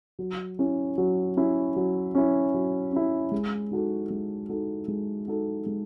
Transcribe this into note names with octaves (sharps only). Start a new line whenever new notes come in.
F#3
C#4 E4
F#3
C#4 E4
F#3
C#4 E4
F#3
C#4 E4
G#3
D#4 F#4 A4
G#3
D#4 F#4 A4
G#3
D#4 F#4 A4
G#3